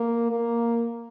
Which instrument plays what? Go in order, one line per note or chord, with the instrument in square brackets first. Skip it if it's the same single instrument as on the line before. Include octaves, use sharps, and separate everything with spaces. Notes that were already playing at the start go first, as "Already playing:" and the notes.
Already playing: [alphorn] A#3
A#3